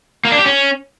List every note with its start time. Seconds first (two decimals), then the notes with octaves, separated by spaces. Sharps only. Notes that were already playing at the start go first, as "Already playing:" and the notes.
0.25 A#3
0.32 D4
0.39 G4
0.46 C#4